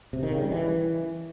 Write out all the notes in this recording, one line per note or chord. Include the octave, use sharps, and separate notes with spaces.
C3
D#3
C#3
G3
E3